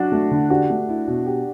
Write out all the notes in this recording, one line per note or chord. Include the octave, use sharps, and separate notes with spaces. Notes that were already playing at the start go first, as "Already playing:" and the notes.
Already playing: F#3 D4 F#4
A3
D3
D4 F#4 G4
A3
E4
B2
G4